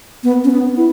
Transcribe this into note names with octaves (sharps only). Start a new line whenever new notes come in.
B3
C#4
B3
E4